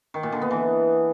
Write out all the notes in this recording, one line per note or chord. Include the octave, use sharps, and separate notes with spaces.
D#3
A#2
D3
B3
E3